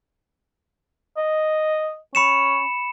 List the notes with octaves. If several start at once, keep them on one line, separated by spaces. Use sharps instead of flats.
D#5
C#4 B5 C#7 E7